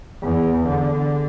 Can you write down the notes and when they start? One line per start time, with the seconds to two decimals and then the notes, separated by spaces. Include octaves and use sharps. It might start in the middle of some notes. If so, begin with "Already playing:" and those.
0.22 E2
0.65 D3